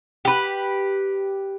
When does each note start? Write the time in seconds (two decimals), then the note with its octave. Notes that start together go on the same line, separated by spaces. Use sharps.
0.25 G4 B4